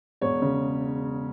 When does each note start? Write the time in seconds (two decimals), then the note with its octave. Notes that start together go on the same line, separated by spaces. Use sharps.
0.21 E1 C#5
0.42 C#3